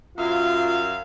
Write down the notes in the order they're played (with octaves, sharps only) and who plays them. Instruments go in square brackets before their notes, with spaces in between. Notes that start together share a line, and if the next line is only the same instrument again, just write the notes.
[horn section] F#2 E5 F5 [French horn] F4